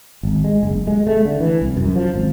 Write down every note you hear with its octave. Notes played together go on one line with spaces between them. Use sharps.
G#1
G#3
F#1
G#3
A3
D3
E3
C2
F#2
F3
G#1